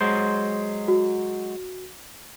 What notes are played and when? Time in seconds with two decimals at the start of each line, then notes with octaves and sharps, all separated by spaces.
0.01 F#3 G#3 C5
0.88 F#4